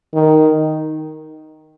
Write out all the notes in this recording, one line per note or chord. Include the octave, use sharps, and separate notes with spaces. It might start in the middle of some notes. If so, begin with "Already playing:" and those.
D#3